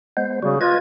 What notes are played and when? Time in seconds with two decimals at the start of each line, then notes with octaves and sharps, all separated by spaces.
0.17 G#3 B3 C5
0.43 C#3 G3 F#4
0.61 F4 B4 D#5 G#6